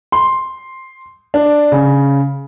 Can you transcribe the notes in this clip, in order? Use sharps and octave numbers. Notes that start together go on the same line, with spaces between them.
C6
D4
C#3